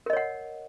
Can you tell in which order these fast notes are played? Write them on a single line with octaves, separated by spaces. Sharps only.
A#4 D#5 C#5 F#5